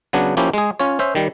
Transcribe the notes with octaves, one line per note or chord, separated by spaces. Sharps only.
C#3 F#3 B3 D4
F3 A#3 C#4 E4 G4
G#3 G#4
C#4 F4 C#5
C#4 C5 E5
D#3 G3